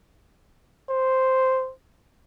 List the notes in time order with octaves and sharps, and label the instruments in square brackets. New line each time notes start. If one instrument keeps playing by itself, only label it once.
[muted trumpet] C5